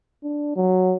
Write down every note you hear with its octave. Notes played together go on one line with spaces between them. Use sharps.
D4
F#3